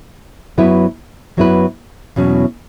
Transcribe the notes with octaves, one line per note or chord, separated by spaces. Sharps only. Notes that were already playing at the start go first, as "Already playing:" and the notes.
F#2 F#3 B3 E4 B4
F#2 F#3 B3 E4 B4
E2 B2 F#3 C#4